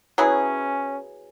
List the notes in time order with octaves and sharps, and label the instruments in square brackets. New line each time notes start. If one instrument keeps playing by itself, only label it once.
[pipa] F#3 B3 E4 G#4 [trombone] C#4